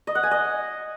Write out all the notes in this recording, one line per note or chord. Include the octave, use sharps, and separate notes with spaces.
D#5
F#5
G#5
D#5